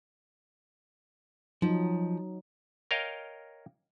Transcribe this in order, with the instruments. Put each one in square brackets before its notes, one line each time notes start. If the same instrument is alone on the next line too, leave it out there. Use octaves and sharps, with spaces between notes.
[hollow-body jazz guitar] F3 [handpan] F#3 D#4
[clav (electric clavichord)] A#4 C#5 D#5 F5 G5